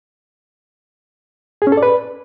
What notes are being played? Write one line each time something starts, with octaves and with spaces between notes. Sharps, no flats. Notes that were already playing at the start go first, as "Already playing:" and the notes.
G#4
C#4
A4
D5
B4